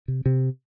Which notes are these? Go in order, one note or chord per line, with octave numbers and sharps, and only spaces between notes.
C3
C3